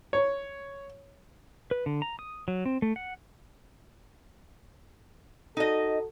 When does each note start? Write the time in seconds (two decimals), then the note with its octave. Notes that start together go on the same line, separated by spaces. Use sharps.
0.13 C#5
1.71 B4
1.86 D3
2.02 A#5
2.19 D#6
2.48 F#3
2.66 C4
2.82 A3
2.96 F#5
5.57 D#4 F#4 A4 D#5